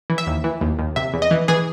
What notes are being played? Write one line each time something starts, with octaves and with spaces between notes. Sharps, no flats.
E3
E5
D#2
E3
D#2
D#2
C3 E5
E2
D#5
E3
E3 G#4